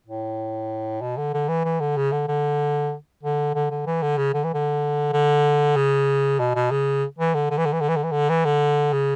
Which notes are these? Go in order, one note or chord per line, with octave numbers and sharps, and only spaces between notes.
A2
B2
D3
D3
E3
E3
D3
C#3
D3
D3
D3
D3
D3
E3
D3
C#3
D3
E3
D3
D3
C#3
B2
B2
C#3
E3
D3
D3
E3
D3
E3
D3
E3
D3
E3
D3
E3
D3
C#3